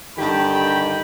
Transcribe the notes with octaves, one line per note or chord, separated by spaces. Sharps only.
G2 D3 D#3 G4 G5 B5